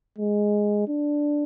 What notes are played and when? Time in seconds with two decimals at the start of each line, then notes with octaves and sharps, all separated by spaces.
0.18 G#3
0.88 D4